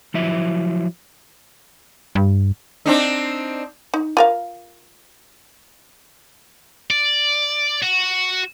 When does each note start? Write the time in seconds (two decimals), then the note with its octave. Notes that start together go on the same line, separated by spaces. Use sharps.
0.14 F3 F#3 E4 E5
2.15 G2
2.86 C4 D4 D#4
3.94 D#4
4.17 F4 A#4 F5
6.91 D5
7.82 F#4